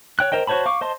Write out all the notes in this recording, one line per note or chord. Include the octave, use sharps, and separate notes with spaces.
C#5 G5 F#6
A#4 C5 D#5 G5
F#4 C5 C#5 A5 B5
F5 C#6 D6
C5 D#5 A5 C6